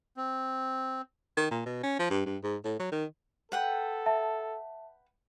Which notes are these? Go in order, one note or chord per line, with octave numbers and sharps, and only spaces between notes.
C4
D#3
A#2
B2
C#4
F3
G2
G2
G#2
A2
F#3
D#3
A4 B4 F#5 G5
E5 A5